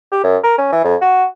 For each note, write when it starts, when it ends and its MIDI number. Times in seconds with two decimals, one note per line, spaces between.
0.12 0.19 67
0.24 0.37 42
0.44 0.58 70
0.58 0.69 61
0.72 0.82 52
0.84 0.96 41
1.01 1.25 66